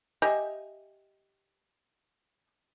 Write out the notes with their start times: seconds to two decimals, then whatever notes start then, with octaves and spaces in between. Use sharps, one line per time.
0.22 G4 D#5 E5 G#5